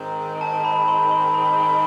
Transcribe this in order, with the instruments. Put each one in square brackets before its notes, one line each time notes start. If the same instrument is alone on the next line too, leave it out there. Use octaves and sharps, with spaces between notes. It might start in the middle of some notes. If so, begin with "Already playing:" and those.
Already playing: [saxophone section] G#2 D#3 G#3 C4 [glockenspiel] A#5
[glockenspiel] A5
B5
C6
C6
B5